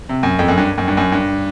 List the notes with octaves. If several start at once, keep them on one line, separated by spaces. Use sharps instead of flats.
C3
F#2
F2
F#2
G2
F#2
G2
F#2
G2